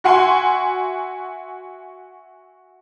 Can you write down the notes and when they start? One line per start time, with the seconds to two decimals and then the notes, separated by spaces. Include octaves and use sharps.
0.04 F#4 E5 F#5 G#5 C6